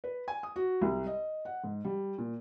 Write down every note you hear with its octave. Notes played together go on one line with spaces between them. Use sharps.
B4
G#5
D#6
F#4
C2
D#5
F#5
G#2
G3
A#2